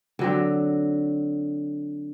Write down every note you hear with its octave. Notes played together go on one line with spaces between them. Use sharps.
D3 F#3 C4